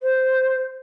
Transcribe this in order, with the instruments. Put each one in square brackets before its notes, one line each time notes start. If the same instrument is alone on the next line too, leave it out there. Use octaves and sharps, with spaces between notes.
[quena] C5